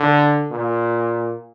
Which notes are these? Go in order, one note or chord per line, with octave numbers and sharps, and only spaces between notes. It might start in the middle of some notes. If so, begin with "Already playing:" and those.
Already playing: D3
A#2